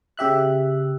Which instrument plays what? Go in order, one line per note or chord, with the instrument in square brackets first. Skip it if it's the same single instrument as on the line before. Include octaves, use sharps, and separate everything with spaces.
[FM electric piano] C#3 G4 E5 F#6